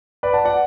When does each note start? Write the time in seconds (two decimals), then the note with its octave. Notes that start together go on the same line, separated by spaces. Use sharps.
0.23 B4 D5
0.33 F#5 A5
0.45 D5 F#5